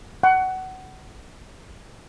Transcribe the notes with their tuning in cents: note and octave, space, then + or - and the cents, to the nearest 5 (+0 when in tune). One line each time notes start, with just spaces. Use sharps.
F#5 +20